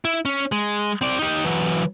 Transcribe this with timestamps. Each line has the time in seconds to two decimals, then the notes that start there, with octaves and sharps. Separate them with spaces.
0.05 E4
0.25 C#4
0.52 G#3
1.02 C4 D5
1.19 D#4 G4
1.44 E3 F#3